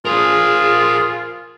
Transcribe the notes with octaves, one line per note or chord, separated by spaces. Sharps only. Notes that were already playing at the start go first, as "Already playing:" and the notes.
F4 G#4 A#4 C5